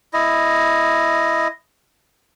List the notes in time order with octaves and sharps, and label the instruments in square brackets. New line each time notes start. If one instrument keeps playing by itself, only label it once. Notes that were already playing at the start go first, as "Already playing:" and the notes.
[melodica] E4 D#5